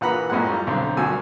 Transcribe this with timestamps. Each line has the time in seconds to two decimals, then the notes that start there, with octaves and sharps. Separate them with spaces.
0.01 A#1 E3 F#5 A#5 B5
0.30 A1 F#2 A#2 G#3 F#5
0.50 G3 F4 A#5
0.67 B1 D3 C4 C5
0.97 G#1 D2 G2 F#4 G#5 E6